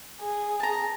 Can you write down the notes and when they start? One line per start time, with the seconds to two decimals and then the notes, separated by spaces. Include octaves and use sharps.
0.21 G#4
0.60 A5 A#5